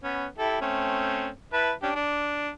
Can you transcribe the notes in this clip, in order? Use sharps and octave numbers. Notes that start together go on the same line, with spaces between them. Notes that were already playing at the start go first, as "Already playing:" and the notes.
B3 C#4
E4 G4 A4
A3 C4 C#4
E4 B4 A5
C#4 D4 G4
D4